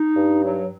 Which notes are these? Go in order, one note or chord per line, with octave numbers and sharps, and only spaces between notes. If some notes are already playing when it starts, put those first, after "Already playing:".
Already playing: D#4
G2
F#3